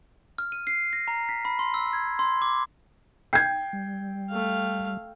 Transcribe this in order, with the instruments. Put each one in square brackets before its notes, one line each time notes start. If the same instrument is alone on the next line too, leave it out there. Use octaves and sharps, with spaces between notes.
[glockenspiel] F6
D#7
C7
A#6
A#5
B6
B5
C6
E6
G#6
C6
D6
[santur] G5 [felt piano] G#6 C7
[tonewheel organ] G3
[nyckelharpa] A3 F5